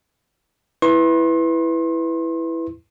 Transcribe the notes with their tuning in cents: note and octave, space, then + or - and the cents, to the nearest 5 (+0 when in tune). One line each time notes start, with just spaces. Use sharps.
E4 +0 B4 +0 C6 +35